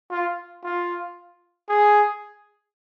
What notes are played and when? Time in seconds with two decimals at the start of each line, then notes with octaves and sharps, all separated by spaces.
0.10 F4
0.63 F4
1.69 G#4